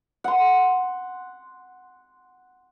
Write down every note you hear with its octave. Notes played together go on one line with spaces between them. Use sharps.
F#5 C6